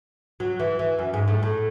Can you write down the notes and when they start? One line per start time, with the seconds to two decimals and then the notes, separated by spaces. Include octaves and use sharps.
0.40 F#3
0.60 E3
0.79 E3
0.99 F#2
1.14 G#2
1.28 A2
1.43 A2